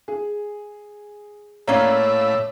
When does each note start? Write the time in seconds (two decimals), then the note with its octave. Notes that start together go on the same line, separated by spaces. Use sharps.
0.08 G#4
1.68 A2 A#3 C#4 C#5 D5 E5 F5